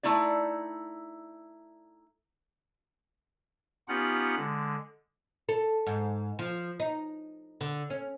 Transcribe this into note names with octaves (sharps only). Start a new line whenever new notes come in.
A3 D#4 E4 D5
B3 C#4 D#4 F4 G4 F#5
D3 G#3
A4
G#2
F3
D#4
D3
C#4